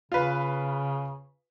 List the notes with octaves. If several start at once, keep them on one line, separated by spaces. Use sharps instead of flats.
C#3 F4 B4